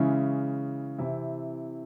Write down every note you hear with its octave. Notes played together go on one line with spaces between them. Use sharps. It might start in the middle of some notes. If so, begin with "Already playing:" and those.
Already playing: C#3 E3 G#3 C#4 E4
C3 E3 C4 E4